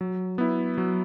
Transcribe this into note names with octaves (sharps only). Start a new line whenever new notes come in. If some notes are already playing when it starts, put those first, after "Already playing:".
F#3
B3 E4
F#3